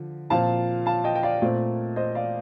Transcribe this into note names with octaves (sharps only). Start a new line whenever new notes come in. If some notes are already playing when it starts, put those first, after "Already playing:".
Already playing: D3 F3
A#2 F3 C4 F5 A5
F5 A5
D#5 G5
G5
D5 F5
A#2 A3 C4
C5 D#5
D5 F5